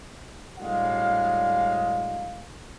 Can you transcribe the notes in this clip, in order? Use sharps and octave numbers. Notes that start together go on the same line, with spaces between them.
A2 G3 G#3 D4 F#4 F5